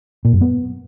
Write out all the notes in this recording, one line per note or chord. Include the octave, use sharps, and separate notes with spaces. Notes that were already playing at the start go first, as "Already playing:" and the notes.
A#2
F#2
B3